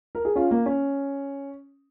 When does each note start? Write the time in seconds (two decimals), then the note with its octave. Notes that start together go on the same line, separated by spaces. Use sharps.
0.15 A#4
0.25 G#4
0.35 C#4 F4
0.51 A#3
0.66 C#4